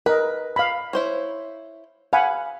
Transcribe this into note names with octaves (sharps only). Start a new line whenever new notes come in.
A#4 B4 D#5
F5 B5
E4 C5 C#5
F5 F#5 G#5 B5